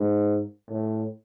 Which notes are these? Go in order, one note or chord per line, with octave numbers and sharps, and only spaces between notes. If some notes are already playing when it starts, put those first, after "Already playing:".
Already playing: G#2
A2